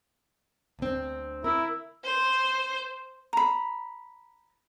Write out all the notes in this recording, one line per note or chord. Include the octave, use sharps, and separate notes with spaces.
D2 C4
E4 A#4
C5
A#5 B5